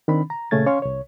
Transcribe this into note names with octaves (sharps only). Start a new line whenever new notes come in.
D#3 C4 D4 B5
A#5
A#2 C#3 A3 C#4 G#6 A6
C#4 C#5 F5 C6 C#6
C2 C#5